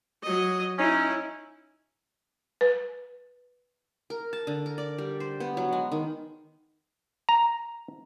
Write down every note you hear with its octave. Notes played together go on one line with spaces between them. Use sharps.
F#3 D#5
C#4 D#4 E4
B4
A#4
A5
D3
A#4
D5
G3
C5
B3
F#3
G#3
D#3
A#5